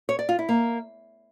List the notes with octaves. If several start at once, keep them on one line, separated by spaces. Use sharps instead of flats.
C#5
D5
F4
E4
A#3